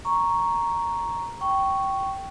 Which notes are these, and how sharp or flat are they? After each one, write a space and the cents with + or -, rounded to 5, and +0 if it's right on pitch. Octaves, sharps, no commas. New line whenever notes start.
A#5 +0 C#6 +0
G5 -15 C#6 +0